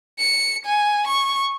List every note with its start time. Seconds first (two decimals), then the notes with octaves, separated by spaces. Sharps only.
0.19 C#7
0.65 G#5
1.07 C#6